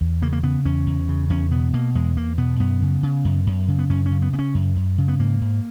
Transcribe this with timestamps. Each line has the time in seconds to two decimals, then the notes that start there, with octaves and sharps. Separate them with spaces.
0.01 E2
0.22 C#3 A#3
0.33 A#3
0.43 C#3 B3
0.65 E2 C#4
0.86 E2
1.09 C#3
1.30 E2 C#4
1.51 B2 B3
1.73 B2 A#3
1.95 E2 G#3
2.17 E2 A#3
2.38 B2 B3
2.60 F#2 B3
2.82 C#3
3.03 C#3
3.25 F#2
3.47 F#2
3.68 C#3
3.79 B3
3.90 F#2 C#4
4.06 C#4
4.11 C#3
4.22 B3
4.33 C#3 B3
4.39 C#4
4.55 F#2
4.76 F#2
4.98 C#3
5.08 B3
5.20 G#2 A#3
5.41 G#2